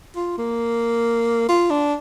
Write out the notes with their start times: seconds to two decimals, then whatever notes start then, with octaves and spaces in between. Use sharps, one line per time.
0.16 F4
0.38 A#3
1.49 F4
1.70 D4